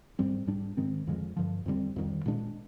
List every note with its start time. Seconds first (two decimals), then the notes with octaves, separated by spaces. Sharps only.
0.19 G#2 G3 C4
0.47 G#2 G3 D4
0.77 G#2 D#3 G#3 C4
1.07 F2 D3 F3 G#3
1.37 G2 D3 F3
1.66 F2 D3 G3 C4
1.96 F2 D#3 G3
2.26 A#2 G#3 D4